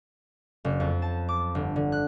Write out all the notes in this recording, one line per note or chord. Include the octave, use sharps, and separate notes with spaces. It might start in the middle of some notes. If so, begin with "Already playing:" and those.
F#1
F2
A5
D6
G1
D3
F#6